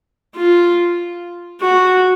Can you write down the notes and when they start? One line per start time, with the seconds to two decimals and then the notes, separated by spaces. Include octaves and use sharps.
0.36 F4
1.61 F#4